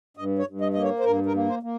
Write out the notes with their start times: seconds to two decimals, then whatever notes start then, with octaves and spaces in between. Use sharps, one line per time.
0.17 G2 D#5
0.39 C#5
0.47 G2
0.61 D#5
0.74 A#3 D#5
0.83 C#5
0.99 C5
1.04 G2 A#4
1.26 A#4
1.33 A#3
1.49 C5
1.63 A#3